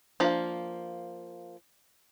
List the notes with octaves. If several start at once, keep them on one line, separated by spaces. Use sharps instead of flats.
F3 A#3 D4 F5